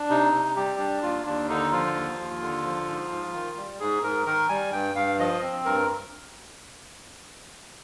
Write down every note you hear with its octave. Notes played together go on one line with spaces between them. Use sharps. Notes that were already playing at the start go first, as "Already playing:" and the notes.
Already playing: D4
C3 D#4
C3
G3 G4
D4
D#2 F4
D#2 D4
D3 D#4
F3 F4
D#2
D#2
D3
F3
G#2
G#2
D#3
G3
G#2 G#4
G#2 A#4
D#3 A#4
G3 G#5
G2 G5
G2 F5
F3 D#5
C4
G2 A#4